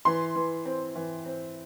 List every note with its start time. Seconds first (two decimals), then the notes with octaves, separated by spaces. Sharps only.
0.05 E3 C6
0.36 E3
0.65 C4
0.96 E3
1.26 C4